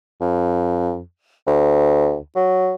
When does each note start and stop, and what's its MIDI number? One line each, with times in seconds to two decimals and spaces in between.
0.21 1.01 41
1.47 2.18 38
2.36 2.75 54